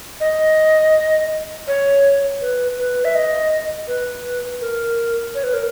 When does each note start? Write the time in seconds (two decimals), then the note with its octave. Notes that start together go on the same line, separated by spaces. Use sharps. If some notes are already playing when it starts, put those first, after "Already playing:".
0.20 D#5
1.68 C#5
2.42 B4
2.78 B4
3.05 E5
3.15 D#5
3.88 B4
4.61 A#4
5.35 C#5
5.44 B4
5.54 A#4